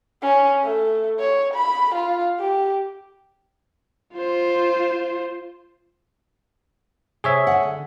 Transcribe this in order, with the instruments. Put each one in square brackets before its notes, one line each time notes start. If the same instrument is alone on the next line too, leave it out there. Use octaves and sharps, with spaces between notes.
[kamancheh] C#4
A3
C#5
B5
F4
G4
[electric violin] F4 C5
[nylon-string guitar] C3 [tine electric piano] G#4 C#5 E5
[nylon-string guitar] D3 F#5